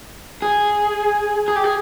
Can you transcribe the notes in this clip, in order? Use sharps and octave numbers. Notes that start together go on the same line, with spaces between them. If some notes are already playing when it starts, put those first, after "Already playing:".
G#4
G#4
G4
G#4